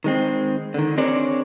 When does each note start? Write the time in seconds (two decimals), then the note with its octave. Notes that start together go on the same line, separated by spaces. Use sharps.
0.04 D#3 G#3 C4
0.74 D3 D#3
0.98 C4 D4 G#4 A#4 C#5 D5